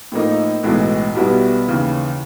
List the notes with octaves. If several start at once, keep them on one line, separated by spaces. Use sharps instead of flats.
A2 F3 A#3 D#4
B1 A2 E3 G#3
B1 B2 G3 B3 E4
D#2 C#3 E3